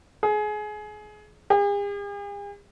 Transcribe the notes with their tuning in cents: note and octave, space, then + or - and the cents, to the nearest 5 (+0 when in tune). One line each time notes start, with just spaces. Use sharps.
G#4 +25
G#4 -45